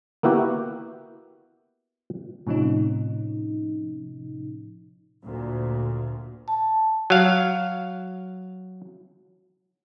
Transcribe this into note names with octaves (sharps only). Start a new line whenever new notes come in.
A#3 B3 E4 F#4 G4
A2 C3 F3 C#4 D#4
D2 A#2
A5
F#3 F5